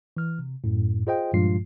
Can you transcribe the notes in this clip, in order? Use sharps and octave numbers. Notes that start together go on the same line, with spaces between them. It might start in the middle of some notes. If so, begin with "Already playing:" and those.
E3 F6
C3
F#2 A2
F4 G#4 C5 D#5 F5 G5
G2 A#2 F3 G#3 F4 C7